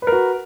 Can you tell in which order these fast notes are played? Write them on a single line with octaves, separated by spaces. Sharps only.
B4 A#4 F#4